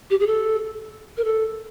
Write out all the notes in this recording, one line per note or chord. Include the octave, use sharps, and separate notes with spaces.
G4
G#4
A4
A#4
A4